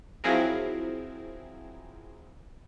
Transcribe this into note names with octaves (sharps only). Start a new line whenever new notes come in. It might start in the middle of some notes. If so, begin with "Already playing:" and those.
F3 F#3 C4 E4 G#4 A#4